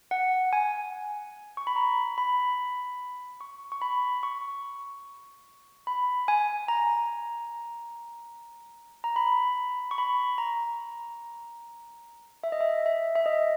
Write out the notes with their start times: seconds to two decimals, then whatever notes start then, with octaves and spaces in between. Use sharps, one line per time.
0.11 F#5
0.53 G#5
1.57 C#6
1.67 B5
1.76 A#5
2.18 B5
3.41 C#6
3.72 C#6
3.82 B5
4.23 C#6
5.87 B5
6.28 G#5
6.68 A#5
9.04 A#5
9.16 B5
9.91 C#6
9.98 B5
10.38 A#5
12.43 E5
12.52 D#5
12.61 E5
12.86 E5
13.16 E5
13.26 D#5